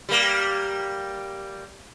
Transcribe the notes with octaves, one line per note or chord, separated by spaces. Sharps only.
G3 A#3